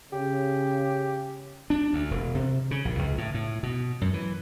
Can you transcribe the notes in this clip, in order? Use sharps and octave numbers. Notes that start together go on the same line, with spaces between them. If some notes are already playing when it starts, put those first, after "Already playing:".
C#3 G4
D4
D2
E1
C3
C#3
A#1
C#2
A2
A2
B2
F#2
E3